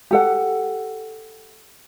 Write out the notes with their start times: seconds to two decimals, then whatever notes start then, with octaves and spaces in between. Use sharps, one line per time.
0.11 G4 A4 F#5